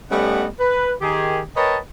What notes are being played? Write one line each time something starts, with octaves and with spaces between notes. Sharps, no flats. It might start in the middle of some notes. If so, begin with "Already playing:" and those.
G3 A3 B3 C#4 D#5 F#5
B4
D#3 G4 G#4
A#4 B4 C#5 D#5 G5 A5